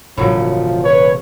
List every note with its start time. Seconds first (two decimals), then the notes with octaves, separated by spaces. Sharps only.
0.18 E1 A2 C#3 F3 F#3
0.84 B4 C#5